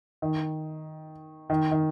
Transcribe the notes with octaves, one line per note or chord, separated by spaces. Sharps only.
D#3
D#3
D#3